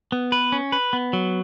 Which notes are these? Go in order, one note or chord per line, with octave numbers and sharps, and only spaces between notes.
B3
B4
C#4
B4
B3
F#3